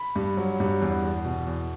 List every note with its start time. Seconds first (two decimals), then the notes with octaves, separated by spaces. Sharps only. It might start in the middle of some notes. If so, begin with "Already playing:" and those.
Already playing: B5
0.16 G2
0.37 F#3
0.60 G2
0.81 E2
1.03 E2
1.25 B2
1.47 E2